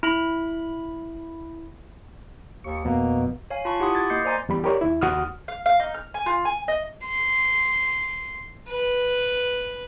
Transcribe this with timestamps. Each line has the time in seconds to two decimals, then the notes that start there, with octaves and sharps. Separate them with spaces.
0.03 E4 B5
2.64 D#2 C#6
2.85 F2 B2 A#3
3.50 C#5 F5 G#5
3.65 F4 A5 B5 C#6
3.80 E4 G4 F#5 B5 C6 D#6
3.95 D6 G#6 A6
4.10 A#3 D#5 G6 C7 C#7
4.25 C5 D5 G#5 A#5 C6 A6
4.49 E2 G3 B5
4.64 G4 A#4 C#5 D5
4.81 D#2 E4
5.01 D#2 F#4 F#5 D#6 F6
5.48 F5
5.66 F5
5.80 D#4
5.94 F6
6.14 G#5
6.26 F4
6.45 G#5
6.68 D#5
7.05 C6
8.69 B4